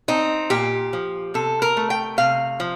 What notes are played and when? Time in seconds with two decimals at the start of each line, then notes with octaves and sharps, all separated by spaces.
0.08 C4 D#4
0.50 A#2 G4
0.93 F3
1.34 C3 A4
1.62 A#4
1.77 A3
1.90 G5
2.18 C3 F5
2.60 F3